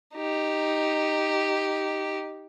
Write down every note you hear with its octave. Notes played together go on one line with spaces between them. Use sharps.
D#4 G4